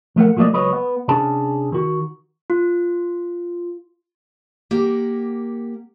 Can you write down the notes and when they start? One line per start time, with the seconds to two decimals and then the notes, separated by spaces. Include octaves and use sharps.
0.16 F3 A3 A#4 F#5
0.36 F3 F#3 A3 A#3 D5 D#5
0.53 C#2 F#3 B4 C#5 D#5
0.73 B3
1.08 C3 C#4 D4 G#4 A5
1.72 D#3 F#4
2.50 F4
4.71 A#3 G4 A#4 F#5